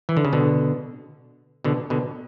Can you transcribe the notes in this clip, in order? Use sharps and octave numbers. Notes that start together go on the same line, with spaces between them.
E3
D3
C#3
B2 D3
B2 D3
B2 D3